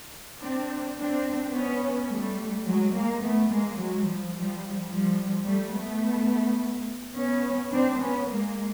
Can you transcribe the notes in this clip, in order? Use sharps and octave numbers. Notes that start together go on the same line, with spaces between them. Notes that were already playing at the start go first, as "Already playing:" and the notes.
C4 D4
C4 D4
B3 C#4
G3 A3
F#3 G#3
G#3 A#3
A3 B3
G#3 A#3
F#3 G#3
F3 G3
F3 G3
F3 G3
G3 A3
A3 B3
B3 C#4
C4 D4
B3 C#4
G#3 A#3